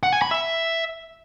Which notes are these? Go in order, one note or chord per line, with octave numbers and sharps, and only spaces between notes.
F#5
G#5
B5
E5